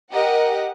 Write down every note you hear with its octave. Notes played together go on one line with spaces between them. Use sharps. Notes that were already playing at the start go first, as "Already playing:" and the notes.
G4 A#4 D#5 F#5